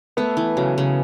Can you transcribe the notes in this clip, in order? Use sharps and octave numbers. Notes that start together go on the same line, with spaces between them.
A3 B3
E3
C#3 F#3
C#3